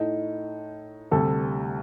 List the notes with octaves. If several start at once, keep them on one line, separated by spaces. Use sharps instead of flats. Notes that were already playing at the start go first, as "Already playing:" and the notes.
Already playing: A2 A3 D#4
D2 C3 G3 A4